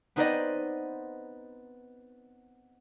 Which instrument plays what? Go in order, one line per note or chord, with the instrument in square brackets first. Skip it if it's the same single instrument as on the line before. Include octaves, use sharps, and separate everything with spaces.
[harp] B3 C4 D#4 B4 D5 D#5